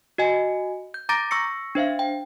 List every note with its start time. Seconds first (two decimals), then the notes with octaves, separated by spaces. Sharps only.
0.18 F#4 D#5 G#5
0.94 G6
1.09 A#5 D6 G6 A6 A#6 D7
1.31 C#6 E6 A#6 C#7
1.75 D4 C5 E5 F5
1.99 G5